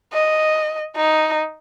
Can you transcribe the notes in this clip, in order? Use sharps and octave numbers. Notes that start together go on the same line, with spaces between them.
D#5
D#4